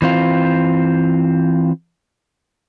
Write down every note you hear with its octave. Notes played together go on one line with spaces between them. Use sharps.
E3 C4 F4